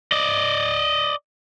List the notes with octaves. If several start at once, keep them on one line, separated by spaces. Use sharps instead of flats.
D5 D#5